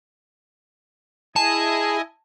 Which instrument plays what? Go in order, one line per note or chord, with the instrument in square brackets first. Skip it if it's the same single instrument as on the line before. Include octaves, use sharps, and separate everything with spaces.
[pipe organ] E4 D#5 G#5 [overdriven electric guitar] G#4 [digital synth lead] A5